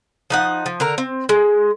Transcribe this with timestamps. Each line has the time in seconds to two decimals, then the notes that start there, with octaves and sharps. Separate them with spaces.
0.30 F3 D#4 F#5
0.66 F3
0.80 D3 A#4 A#5
0.98 C4
1.29 G#3